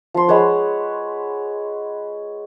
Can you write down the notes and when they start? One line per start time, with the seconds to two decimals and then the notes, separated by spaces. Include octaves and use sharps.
0.14 F3 C6
0.28 G#3 B4 C#5 F#5